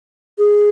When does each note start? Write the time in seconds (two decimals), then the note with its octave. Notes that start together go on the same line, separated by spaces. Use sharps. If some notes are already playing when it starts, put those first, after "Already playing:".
0.39 G#4